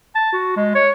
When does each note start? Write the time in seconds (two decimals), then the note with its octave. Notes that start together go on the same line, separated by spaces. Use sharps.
0.15 A5
0.33 F#4
0.57 G#3
0.75 C#5